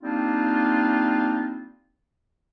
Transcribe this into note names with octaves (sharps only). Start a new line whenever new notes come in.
G3 A#3 C4 D4 D#4 F4